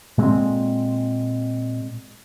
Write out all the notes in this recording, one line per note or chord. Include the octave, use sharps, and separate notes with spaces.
A#2 G#3 C4